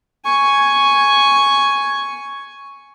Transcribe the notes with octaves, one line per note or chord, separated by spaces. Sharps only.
G#5 C#6